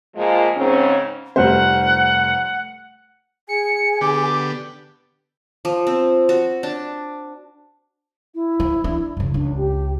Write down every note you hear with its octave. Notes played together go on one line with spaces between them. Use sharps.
A#2 F3 G#3
G#2 C#3 C4 C#4
F1 G3 C5 F#5
G#4 G#5 C#7
D3 B3 G4 D6
F3
C4
F#4
D4
E4
F3
D4
F#2 C#3
C#2 D4
G4